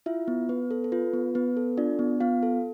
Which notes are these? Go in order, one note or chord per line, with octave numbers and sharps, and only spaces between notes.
E4 F4 E5
B3
B3 B4
A4
A4
F4 B4
B3
B3 B4
A4
D4 F4 D5
B3
B3 F4 F5
A4